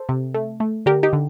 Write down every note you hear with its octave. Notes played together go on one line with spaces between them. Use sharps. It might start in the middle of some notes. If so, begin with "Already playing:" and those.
Already playing: A4 C5
C3
A3
A3
D3 G4 A#4
D#4 G4
D3